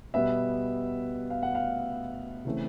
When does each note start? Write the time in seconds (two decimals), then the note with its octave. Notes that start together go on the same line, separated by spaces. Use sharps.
0.14 B2 G3 B3 E5
1.30 F5
1.43 F#5
1.55 F5
2.45 C#3 E3 A3 C4